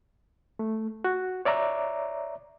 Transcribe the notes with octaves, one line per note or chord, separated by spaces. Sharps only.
A3
F#4
C#5 D5 E5 A#5 D6